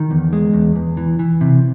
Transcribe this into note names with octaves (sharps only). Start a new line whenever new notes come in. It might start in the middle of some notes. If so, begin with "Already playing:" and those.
Already playing: D#3
E2
G#3
E2
E2
E3
E3
C3